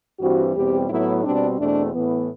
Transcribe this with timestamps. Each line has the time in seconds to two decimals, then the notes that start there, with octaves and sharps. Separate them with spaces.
0.19 G2 E3 G3 C4 F#4
0.54 E2 B2 G3 C4 G4
0.89 A2 F#3 B3 E4
1.23 B2 G3 C4 D4
1.58 E2 B2 A3 C4 D4
1.93 A2 E3 B3